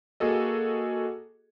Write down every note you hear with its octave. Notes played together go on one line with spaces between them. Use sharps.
A#3 F#4 G#4 A4 D#5